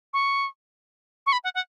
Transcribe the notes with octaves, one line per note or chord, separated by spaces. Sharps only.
C#6
C#6
B5
F#5
F#5